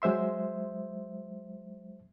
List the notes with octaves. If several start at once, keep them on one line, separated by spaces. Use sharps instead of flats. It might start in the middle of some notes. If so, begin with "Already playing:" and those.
F#3 G#3 C5 E5 C6